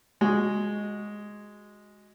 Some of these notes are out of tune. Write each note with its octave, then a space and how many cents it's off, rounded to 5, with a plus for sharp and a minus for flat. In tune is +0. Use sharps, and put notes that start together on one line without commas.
G#3 +0 F#4 +0